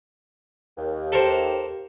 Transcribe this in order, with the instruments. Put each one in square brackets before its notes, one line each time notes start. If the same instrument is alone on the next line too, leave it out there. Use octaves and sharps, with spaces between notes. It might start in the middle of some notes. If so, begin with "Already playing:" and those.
[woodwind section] D#2
[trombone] G4 [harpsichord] A4 A#4 C5